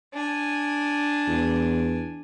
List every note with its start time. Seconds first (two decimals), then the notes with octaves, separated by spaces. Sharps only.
0.13 D4 G#5
1.28 E2